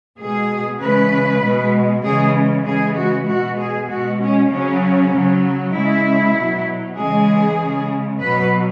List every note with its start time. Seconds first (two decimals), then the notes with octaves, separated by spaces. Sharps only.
0.18 B2 G#3 G#4
0.80 C#3 E3 G#3 B4
1.42 B2 G#3
2.03 C#3 E3 G#3 G#4
2.65 C#3 E3 G#3 G#4
2.96 F#4
3.27 B2 G#3 F#4
3.58 G#4
3.88 B2 G#3 F#4
4.19 C#4
4.50 C#3 F#3 C#4
5.12 C#3 F#3
5.74 C#3 G#3 E4
6.35 B2 F#3
6.97 C#3 E3 G#3 G#4
7.58 C#3 G#3
8.20 B2 F#3 B4